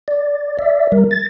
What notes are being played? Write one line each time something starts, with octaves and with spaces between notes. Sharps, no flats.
D5
D5 E5
G3 A#4
A6